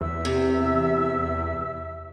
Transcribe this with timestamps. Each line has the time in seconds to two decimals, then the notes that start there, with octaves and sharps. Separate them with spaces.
0.01 E2 E5 E6
0.25 C3